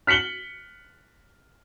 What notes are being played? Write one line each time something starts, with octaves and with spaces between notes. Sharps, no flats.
F6 B6 C#7 F#7 G7